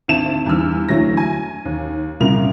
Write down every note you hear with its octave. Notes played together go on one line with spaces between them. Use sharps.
G#1 D2 E5 A5 E7
E2 G2 D#3 E6 F6
D2 E3 F#3 A3 A#6
G#5
D#2
C2 F#2 A#2 C#3 A#4 F7